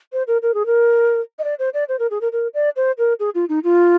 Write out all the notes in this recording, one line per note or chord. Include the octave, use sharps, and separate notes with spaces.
C5
A#4
A#4
G#4
A#4
D#5
D5
C5
D5
C5
A#4
G#4
A#4
A#4
D5
C5
A#4
G#4
F4
D#4
F4